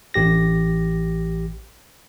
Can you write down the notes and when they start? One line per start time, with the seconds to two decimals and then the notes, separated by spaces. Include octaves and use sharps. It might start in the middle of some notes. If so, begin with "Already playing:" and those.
0.14 A1 G4 A#6